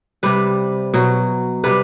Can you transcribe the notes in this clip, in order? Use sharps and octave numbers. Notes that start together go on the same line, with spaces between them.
C3 G3 B4
B2 F#3
C3 G3 B4